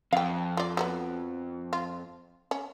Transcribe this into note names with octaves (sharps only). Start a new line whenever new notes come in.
F2 F5 G5
F4 D5
F#3 A3 B3
F4
C#4